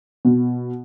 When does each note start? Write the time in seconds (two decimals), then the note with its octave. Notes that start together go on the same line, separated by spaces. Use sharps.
0.25 B2